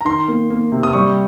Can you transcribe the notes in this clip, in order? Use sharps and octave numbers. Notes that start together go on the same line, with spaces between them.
A#5
D#3 C6
A#3
A#3
C3
D#6
G3 C#6